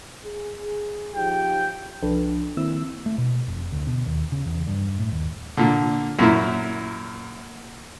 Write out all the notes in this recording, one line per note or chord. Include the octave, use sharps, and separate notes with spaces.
G#4
F3 D#4 G4 G5
C2 F3 D4 A4 B4
D#3 A#3 C4 E4 E6
A3
B2
F1
D2
B2
D#2
C#3
E2
G2
A2
D#2
A#2 D3
F#2 A#2 E4